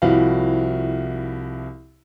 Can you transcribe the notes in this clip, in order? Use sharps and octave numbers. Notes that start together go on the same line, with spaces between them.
C2 F3 E4 F#4 F5